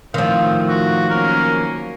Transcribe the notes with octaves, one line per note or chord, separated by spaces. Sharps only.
A2 D#3 F3 A3 C4
F#4
F#3 A#3 C#4 A#4